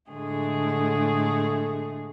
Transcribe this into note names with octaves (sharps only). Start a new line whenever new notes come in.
A2 D3 G#3 A3 G#4